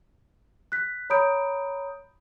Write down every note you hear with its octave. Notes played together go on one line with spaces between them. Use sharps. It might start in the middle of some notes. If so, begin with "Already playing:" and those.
F#6 B6
C#5 A#5 B5 D#6 G6 D7